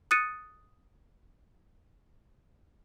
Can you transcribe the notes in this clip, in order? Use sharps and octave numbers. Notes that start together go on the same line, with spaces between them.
D#6 F#6 A6 C#7 D#7